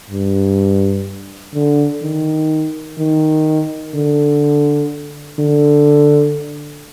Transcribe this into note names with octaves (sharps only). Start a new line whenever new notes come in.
G2
D3
D#3
D#3
D3
D3